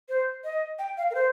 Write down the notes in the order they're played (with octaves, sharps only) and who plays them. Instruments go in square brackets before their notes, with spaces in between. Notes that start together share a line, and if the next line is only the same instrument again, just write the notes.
[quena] C5
D#5
G5
F5
A#4
C5